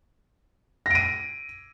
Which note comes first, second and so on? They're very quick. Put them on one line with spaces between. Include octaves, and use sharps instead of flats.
A#6 D7 D#7